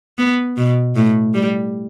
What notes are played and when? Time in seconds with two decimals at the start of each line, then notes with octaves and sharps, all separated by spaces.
0.18 B3
0.57 B2
0.96 A2
1.34 G3